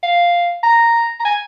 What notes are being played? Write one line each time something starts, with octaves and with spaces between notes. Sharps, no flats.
F5
A#5
A#5
G#5